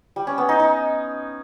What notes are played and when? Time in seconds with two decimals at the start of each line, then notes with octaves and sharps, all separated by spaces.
0.16 G3
0.27 C#4
0.38 B3
0.49 D#4
0.60 D#4